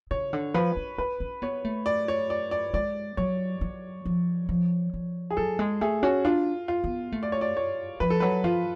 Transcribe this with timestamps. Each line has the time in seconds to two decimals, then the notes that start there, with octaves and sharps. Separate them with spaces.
0.11 C#3 C#5
0.33 D3
0.54 F3 B4
0.77 D4
0.98 C#4 B4
1.20 C#4
1.42 B3 C#5
1.65 A3
1.86 D5
2.08 C#5
2.30 D5
2.51 D5
2.74 G#3 D5
3.17 F#3 C#5
3.61 F#3
4.05 F3
4.49 F3
4.94 F3
5.31 G#4
5.37 F#3 A4
5.59 G#3
5.81 A3 G#4
6.03 C#4 F#4
6.25 D4 F4
6.68 F4
6.84 B3
7.12 A3
7.23 D5
7.32 C#5
7.41 D5
7.57 C#5
8.00 F3 B4
8.10 A4
8.20 F#3 B4
8.44 F3 F4